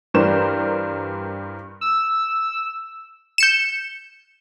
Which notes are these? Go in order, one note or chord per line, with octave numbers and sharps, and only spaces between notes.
G2 E3 G3 A#4 C5 E7
E6
G6 C#7 E7